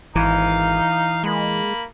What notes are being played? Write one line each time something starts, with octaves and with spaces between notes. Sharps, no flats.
G#1 E3 D#4 F5
G#3 A#3 B5